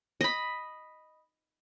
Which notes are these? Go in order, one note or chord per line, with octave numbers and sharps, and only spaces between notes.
D#5 B5